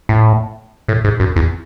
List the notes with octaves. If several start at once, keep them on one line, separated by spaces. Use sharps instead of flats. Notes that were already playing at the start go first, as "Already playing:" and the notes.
A2
A2
G#2
F#2
E2